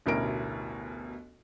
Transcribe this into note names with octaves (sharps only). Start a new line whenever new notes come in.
A1 D2 B2 E4 A#4 D7